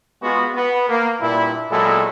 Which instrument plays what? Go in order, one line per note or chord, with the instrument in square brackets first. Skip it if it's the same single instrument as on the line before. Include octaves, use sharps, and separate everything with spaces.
[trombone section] G#3 B3 F4 F#4
B3
A#3
G2 A#2 D4 E4
A#2 F#3 G#3 B3 E4 A4